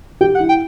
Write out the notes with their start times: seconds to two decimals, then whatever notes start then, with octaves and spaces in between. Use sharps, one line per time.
0.21 G4 G5
0.35 F#5
0.40 E4
0.49 G5